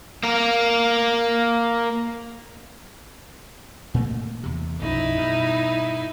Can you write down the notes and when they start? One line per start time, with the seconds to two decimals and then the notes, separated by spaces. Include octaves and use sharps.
0.23 A#3 A#4
3.94 A#2 A3 A#3
4.43 E2 C3
4.81 B1 F#2 F3 D#4 E4
5.17 G2 B2